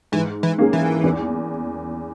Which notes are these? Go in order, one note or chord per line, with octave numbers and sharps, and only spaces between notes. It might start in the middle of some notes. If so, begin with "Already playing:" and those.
G#2 E3
E3
D#3 A#3 C#4 G#4
E3
E2